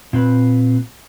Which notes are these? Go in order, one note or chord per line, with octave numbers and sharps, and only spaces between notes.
A#2 C4 B4